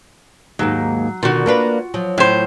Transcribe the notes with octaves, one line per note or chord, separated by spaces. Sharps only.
D#2 G#2 F#3 A#3
B2 D3 D#3 F4 F#4
A#3 D4 B4
F3 F#3
A2 C5